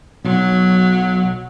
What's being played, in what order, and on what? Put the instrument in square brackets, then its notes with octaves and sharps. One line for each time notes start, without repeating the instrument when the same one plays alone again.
[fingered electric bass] B1 [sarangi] F#3